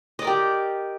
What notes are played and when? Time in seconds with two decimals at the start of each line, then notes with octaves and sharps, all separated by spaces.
0.19 D#5
0.22 D5
0.24 A#4
0.27 G4